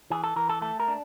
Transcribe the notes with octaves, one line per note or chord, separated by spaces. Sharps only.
E3 G#4
A4
E3 A#4
A4
A3 A4
A#4
D4